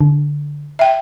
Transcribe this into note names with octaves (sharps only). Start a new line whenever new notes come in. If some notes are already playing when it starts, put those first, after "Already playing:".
D3
E5 G5